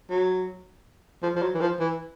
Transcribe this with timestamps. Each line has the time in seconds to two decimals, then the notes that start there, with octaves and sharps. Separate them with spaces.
0.10 F#3
1.22 F3
1.36 F3
1.42 F#3
1.55 E3
1.61 F3
1.80 E3